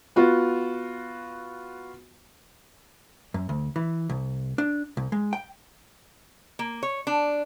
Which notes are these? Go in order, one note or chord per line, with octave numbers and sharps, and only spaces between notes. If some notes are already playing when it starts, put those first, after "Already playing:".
B3 F4 F#4
F#2
D2
E3
C2
D4
C2
G#3
G5
A#3
C#5
D4